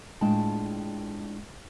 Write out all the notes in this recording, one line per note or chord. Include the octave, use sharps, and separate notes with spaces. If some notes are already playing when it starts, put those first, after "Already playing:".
A2 G#3 D4 F4 G5 A5